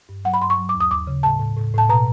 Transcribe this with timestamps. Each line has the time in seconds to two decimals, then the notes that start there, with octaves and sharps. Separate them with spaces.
0.09 G2
0.25 F#3 F#5
0.34 B5
0.41 G2 C6
0.50 C#6
0.58 F#3
0.69 D6
0.75 D#2
0.80 D#6
0.91 D#2 D6
1.07 C#3
1.23 A2 A5
1.40 A2
1.57 A2
1.74 A2 A5
1.89 B2 A#5